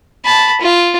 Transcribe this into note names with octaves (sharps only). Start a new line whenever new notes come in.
A5 B5
F4